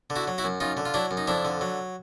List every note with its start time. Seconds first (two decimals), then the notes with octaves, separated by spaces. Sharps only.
0.10 D3
0.16 E4 F#4
0.27 F#3
0.38 E4 F#4
0.44 F#2
0.60 F#2 D#4 F4
0.77 D3
0.85 F4
0.94 F#3 D4 E4
1.11 F#2
1.17 D#4
1.27 F2 D4 E4
1.45 D3
1.61 F#3